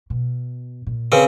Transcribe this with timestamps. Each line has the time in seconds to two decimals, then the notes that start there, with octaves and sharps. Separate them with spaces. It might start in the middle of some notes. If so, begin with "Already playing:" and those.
0.10 B2
0.87 A#2
1.12 C#3 C4 A#4 B4